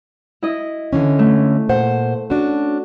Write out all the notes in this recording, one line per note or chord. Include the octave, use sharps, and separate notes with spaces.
E4 D#5
D3 E3 C#4
A3
A#2 C5 F#5
C#4 D4 F#4